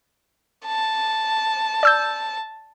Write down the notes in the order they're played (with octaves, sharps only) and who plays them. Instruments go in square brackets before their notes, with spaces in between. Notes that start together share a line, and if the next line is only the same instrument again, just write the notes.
[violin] A5
[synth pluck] D5 E6 G6